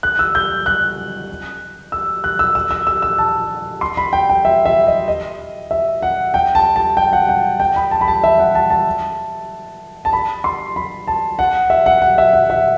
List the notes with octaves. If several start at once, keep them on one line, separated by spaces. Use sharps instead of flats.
F#6
E6
G6
F#6
E6
F#6
E6
E6
E6
E6
E6
A5
C6
B5
G5
G5
E5
E5
D#5
D#5
E5
F#5
G5
A5
A5
G5
F#5
G5
G5
B5
A5
B5
A5
E5
F#5
A5
A5
A5
B5
C6
B5
A5
F#5
E5
F#5
F#5
E5
F#5
E5